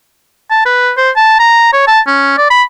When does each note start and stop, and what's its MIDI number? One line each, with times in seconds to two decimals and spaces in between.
0.50 0.61 81
0.66 0.91 71
0.97 1.10 72
1.16 1.35 81
1.39 1.70 82
1.73 1.84 73
1.88 2.00 81
2.07 2.35 61
2.38 2.49 74
2.50 2.63 83